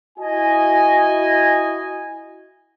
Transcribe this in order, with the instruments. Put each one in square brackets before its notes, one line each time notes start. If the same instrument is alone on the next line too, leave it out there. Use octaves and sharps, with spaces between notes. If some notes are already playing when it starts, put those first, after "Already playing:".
[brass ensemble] E4 F#4 D#5 G#5